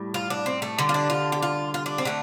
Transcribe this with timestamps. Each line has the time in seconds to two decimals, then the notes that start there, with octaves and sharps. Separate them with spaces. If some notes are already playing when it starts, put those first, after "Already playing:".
Already playing: A2 G3
0.14 F4
0.30 D4
0.46 C4
0.62 A3
0.79 D3 G3
0.89 F4
0.94 D4
1.10 F4
1.32 G4
1.42 F4
1.74 F4
1.86 D4
1.98 C4
2.05 D3 A3